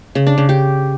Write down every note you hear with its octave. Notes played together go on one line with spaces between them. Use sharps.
C#3
D4
C#3
G4